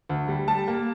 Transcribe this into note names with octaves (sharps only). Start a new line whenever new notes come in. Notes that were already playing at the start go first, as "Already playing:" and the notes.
D2
G3
G3 A5
A#3